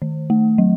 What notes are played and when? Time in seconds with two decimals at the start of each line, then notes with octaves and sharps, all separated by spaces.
0.02 D#3
0.30 A3
0.58 F#3